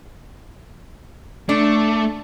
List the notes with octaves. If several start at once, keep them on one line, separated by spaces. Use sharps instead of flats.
A3 D4